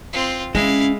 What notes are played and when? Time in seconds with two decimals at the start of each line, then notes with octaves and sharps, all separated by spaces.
0.13 C4 F4
0.55 G#3 C#4 E4 F5